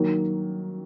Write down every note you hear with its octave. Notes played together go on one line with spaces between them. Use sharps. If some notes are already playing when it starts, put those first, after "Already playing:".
Already playing: D#3 F#3 A#3